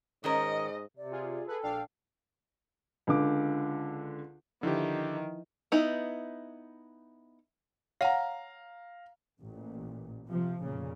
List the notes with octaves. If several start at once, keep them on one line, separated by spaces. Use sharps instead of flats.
G#2 D#3 C#4 A#4 D#5
C3 D5
F4 G#4
G#4 A4 B4
A#1 D4 F5 G5
C#2 D3 D6
D3 D#3 F3 E4 G4 B4
B3 D#4 E4
C#5 F5 F#5 A#5
A1 A#2
C3 F3
F1 A#2 C#3